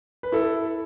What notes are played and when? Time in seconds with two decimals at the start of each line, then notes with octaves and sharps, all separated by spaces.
0.23 B4
0.32 E4 A4